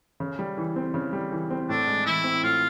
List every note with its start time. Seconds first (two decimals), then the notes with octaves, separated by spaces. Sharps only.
0.20 C#3
0.39 G3
0.57 E3
0.76 C4
0.94 C#3
1.13 G3
1.32 E3
1.50 C4
1.69 A2 D4
1.87 G#3
2.05 E3 E4
2.24 C4
2.43 A2 F4